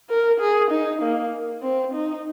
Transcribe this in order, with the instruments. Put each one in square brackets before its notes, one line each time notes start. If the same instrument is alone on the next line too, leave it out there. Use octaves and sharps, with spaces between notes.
[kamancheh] A#4
G#4
D#4
A#3
C4
D#4